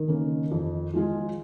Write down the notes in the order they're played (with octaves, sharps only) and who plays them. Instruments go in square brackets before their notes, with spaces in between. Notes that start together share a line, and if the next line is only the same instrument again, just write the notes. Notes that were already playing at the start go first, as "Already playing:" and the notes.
Already playing: [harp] D#3
[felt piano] C#3 A#3
F2
F3 G#3 F4 G#4